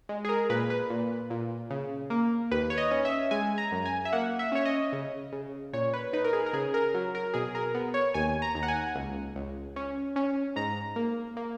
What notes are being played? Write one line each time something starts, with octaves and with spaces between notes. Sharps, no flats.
G#3
G#4
A#4
A#2 B4
B4
A#2
A#2
C#3
A#3
D#2 B4
C#5
D#5
C#4
E5
G#3 G#5
A#5
F#2
G#5
E5
A#3 F#5
E5
C#4 C#5
D#5
C#3
C#3
A#2 C#5
B4
D#4 B4
A#4
G#4
A#4
C#3 G#4
A#4
F#3
A#4
B2 G#4
A#4
B3
C#5
D#2 G#5
A#5
D#2
F#5
G#5
C#2
C#2
C#4
C#4
G#2 A#5
A#3
A#3